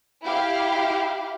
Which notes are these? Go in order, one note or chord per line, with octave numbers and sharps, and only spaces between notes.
E4 G4 F5